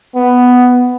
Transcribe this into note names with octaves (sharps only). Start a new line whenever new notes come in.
B3